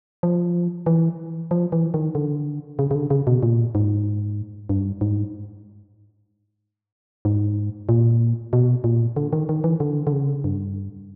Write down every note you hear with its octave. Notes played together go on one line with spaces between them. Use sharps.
F3
E3
F3
E3
D#3
D3
C#3
C#3
D3
C#3
B2
A#2
G#2
G2
G#2
G#2
A#2
B2
A#2
D3
D#3
D#3
E3
D3
D3
C#3
G2